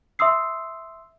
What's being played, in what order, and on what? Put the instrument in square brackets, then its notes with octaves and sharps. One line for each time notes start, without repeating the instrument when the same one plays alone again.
[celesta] E5 C6 D#6 E6 C7